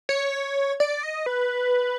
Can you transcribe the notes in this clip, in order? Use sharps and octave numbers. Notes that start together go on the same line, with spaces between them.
C#5
D5
D#5
B4